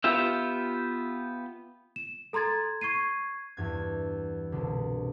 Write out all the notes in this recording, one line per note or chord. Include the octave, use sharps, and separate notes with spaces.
B3 F4 G4 E5
E7
A4 A#5 C6 G#6 A6
C#6 G#6 C7 D#7
E2 G2 G#6
C2 B2 D3